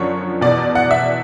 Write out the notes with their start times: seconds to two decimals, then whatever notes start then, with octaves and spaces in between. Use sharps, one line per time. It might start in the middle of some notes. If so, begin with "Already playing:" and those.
Already playing: F#2 D3 F3 C#5
0.41 E2 B2 D5
0.75 F#5
0.91 E5